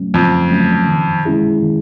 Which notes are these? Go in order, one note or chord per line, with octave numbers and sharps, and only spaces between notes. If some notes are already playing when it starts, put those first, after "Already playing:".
Already playing: C#3 F#3 A3 C#4
F2 C#3
F#3 A3 C#4
D#3
G#3 C#4 E4 G#4
D#3